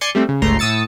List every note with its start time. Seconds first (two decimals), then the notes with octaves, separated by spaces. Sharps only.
0.01 D5 G#5 C6 G#6 C#7
0.15 G3 A3 C4
0.29 C#3
0.42 G1 C#2 A3 A#5 C6
0.59 A2 D#6 E6 A6 C#7